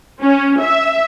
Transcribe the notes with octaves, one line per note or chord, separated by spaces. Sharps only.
C#4
E5